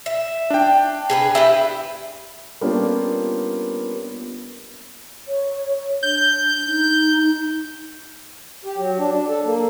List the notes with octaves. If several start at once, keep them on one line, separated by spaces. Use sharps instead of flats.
E5
D4 G5
G#4 A4 B4
E4 G4 B4
G3 A#3 B3 C#4 D4 F4
C#5
D4 G6
D#4
G4
F#3
D4
D4
A4
A#3